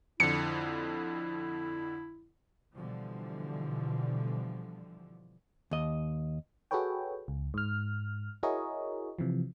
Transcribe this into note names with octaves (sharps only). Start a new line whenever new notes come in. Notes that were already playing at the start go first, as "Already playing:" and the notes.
F2 D3 E4 C#7
B2 D3 E3 F3 G3
D#2 D#5
F#4 G#4 A4 B4 C#5 G5
C#2
G#2 F6
E4 F#4 G#4 A#4 C#5 D#5
C3 E3 F3